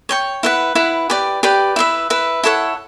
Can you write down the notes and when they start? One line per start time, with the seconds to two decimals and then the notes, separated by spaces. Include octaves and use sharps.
0.09 C#5 G5 C#6
0.43 E4 B4 F#5
0.75 E4 B4 F#5
1.10 G4 B4 D5 G5
1.43 G4 B4 D5 G5
1.76 E4 B4 E5
2.10 E4 B4 E5
2.44 E4 A4 C#5 F#5